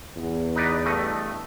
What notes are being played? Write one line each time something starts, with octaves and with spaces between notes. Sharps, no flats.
E2
D#4 B4 D5
G2 A3 D#5